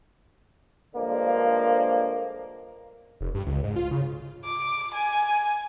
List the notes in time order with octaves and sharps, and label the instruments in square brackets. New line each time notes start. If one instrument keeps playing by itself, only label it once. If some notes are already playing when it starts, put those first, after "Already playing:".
[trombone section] G2 D3 F3 G#3 A#3
[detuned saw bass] F1
G2
C#2
G#2
F4
C#3
[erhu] D6
G#5